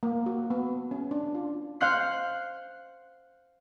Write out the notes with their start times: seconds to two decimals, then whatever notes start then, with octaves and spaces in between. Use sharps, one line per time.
0.03 A#3
0.26 F#4
0.50 B3
0.91 C#4
1.11 D4
1.35 F4
1.81 C5 F5 F#5 F#6 C7